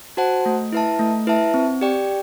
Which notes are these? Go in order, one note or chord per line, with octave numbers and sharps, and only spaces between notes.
F#4 C5 F#5 A5
A3
E4 B4 E5 A5
A3
E4 B4 E5 A5
C4
G4 D5 G5